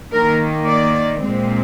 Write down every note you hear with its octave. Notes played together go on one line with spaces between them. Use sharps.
D#3 A#3 A#4
D5
A#2 G#3 C4